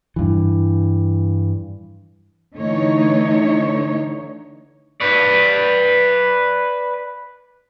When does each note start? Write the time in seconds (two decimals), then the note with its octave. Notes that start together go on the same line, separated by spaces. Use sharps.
0.16 G2 E3
2.56 D3 E3 A3 D#4 C#5
5.01 B4 D5